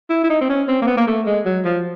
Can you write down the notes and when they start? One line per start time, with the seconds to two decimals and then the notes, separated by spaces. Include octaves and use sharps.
0.10 E4
0.24 E4
0.30 D#4
0.41 C4
0.49 C#4
0.68 C4
0.82 A#3
0.87 B3
0.97 A#3
1.07 A3
1.26 G#3
1.45 F#3
1.65 F3